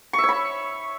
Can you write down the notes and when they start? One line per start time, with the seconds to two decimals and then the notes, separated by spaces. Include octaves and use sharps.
0.13 C#6
0.19 E5
0.24 C#5
0.29 B5